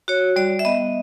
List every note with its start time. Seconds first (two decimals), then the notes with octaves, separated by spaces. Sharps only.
0.08 F#4 C#5
0.36 G3 D5
0.59 E5
0.65 B3 D#5